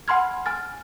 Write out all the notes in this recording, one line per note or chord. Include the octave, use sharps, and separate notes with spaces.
F#5 G#5 B5 C6 F6 G#6
G#5 F6 A6